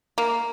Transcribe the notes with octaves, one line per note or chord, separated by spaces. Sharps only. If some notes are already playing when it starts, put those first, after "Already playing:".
A#3